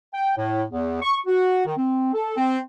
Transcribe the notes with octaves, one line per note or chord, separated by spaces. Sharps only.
G5
A2
E2
C#6
F#4
D#3
C4
A4
C4